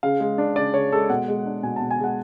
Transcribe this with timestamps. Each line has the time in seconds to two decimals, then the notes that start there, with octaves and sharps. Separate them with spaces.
0.03 C#3 F5
0.20 G#3
0.38 D4
0.56 C#3 D5
0.74 C#3 C#5
0.92 G#3 A4
1.10 B2 F#5
1.28 G#3
1.46 D4
1.63 B2 G#5
1.76 B2 A5
1.91 G#5
2.00 G#3 F#5